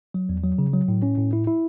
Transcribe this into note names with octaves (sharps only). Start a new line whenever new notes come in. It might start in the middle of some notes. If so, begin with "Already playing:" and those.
F#3
E2
F#3
C#3
F#3
A2
C#4
A2
E4
E4